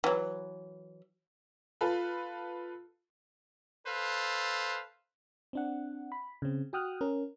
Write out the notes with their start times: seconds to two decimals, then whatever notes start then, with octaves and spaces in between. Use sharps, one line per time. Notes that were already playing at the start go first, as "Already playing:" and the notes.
0.04 E3 F#3
1.81 F4 A4 B4
3.87 A4 B4 C5 F5
5.53 C4 D4 F#5
6.12 B5
6.42 C#3 C4
6.73 F#4 G5 D#6 F6 F#6
7.01 C#4 A#4